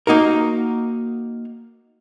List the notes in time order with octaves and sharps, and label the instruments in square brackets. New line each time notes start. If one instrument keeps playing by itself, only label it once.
[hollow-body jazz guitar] A#3 D#4 F#4 A#4